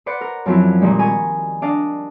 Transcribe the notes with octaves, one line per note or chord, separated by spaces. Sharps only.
B4 C5 D5 F#5 B5
A#4
F#2 F3 F#3 C4 E4
A#2 D#3 G3 G#3
A#4 G#5 B5 C#6
D4 D5 D#5 F5